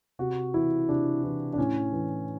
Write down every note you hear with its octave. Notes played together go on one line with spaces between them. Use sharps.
C3 F#4
E3 E4
C3 D4
E3
D4
A2 C#4
E3